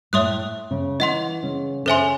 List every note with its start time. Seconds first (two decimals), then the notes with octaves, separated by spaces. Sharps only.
0.13 A2 A3 C#5 E5 C6 D#6 F#6
0.71 C#3 C#4
0.99 E3 E4 D#5 F#5 C6
1.43 C#3 C#4
1.86 C#3 C#4 A4 C5 E5 G#5 C6